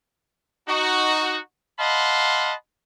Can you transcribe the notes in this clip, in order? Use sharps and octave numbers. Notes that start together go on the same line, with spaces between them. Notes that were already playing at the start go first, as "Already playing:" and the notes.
D#4 F#4
D#5 F5 F#5 A5 B5 C6